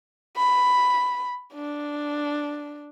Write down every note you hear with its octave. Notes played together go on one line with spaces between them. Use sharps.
B5
D4